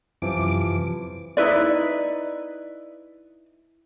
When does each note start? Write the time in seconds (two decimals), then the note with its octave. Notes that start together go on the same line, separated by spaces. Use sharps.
0.22 F#2 C3 E3 F3 D6
1.37 D#4 E4 B4 D5